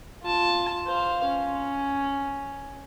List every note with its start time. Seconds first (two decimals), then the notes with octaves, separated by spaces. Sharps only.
0.23 F4 A5
0.87 C5 F5
1.25 C#4